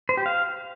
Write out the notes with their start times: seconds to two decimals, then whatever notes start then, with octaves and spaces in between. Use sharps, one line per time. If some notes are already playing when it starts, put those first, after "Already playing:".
0.09 C5
0.17 G4
0.26 F5